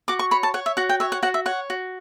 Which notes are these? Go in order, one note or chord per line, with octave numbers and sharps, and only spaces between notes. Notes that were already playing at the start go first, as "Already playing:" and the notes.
F#4 D6
C#6
C#5 B5
A5
C#5 F#5
E5
F#4 F#5
G5
C#5 E5
F#5
F#4 F#5
E5
C#5 F#5
F#4